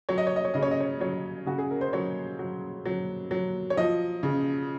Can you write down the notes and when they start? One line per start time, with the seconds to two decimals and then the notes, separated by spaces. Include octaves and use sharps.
0.09 F#3 C#5
0.18 D#5
0.27 C#5
0.36 D#5
0.45 C#5
0.54 C#3 D#5
0.63 C#5
0.71 D#5
0.81 C#5
1.00 F#3 C#5
1.46 C#3 F#4
1.58 G#4
1.71 A#4
1.81 C5
1.93 F#3 C#5
2.39 F#3
2.86 F#3
3.31 F#3
3.70 C#5
3.77 F3 D#5
4.23 C#3